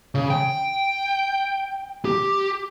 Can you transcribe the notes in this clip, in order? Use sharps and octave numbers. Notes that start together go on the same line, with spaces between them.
C#3
G5
G4